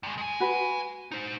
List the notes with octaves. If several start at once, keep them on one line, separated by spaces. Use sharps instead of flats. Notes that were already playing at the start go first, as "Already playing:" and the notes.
G2 G#3
G#3 G#5
F#4 B4
D#4 C5